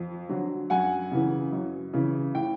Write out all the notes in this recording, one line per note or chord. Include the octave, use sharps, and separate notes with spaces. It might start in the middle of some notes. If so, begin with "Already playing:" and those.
Already playing: F2
D3 F#3
F#2 F#5 G#5
C#3 E3
F#2
C#3 E3
A2 G5